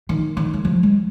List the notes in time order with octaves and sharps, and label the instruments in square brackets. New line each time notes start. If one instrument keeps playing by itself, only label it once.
[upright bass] D#3
D#3
G#3
F3
G#3